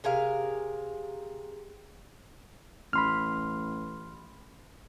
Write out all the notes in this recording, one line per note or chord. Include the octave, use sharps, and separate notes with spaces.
C3 G#4 A#4 F5
A1 B5 C6 F6